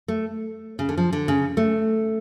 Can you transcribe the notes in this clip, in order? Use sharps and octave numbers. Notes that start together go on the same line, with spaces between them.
A3
C#3
D3
F3
D3
C#3
A3